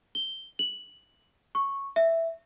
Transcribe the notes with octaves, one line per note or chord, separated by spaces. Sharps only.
G7
F#7
C#6
E5